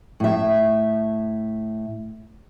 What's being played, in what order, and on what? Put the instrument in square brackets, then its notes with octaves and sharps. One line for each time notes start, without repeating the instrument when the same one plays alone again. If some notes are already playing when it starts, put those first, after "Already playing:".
[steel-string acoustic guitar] A2 E5